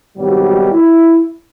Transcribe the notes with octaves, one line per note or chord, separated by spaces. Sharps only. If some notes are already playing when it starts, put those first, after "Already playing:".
G#1 G2 B2 D#3 F#3 G3
E4